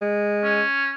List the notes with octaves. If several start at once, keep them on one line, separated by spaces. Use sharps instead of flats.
G#3
C#4